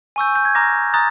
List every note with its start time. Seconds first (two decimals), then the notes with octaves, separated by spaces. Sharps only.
0.16 G#5 C#6 E6 G6
0.36 G6
0.45 G#6
0.55 A#5 D6 F6 A#6
0.94 A#5 D#6 F#6 A6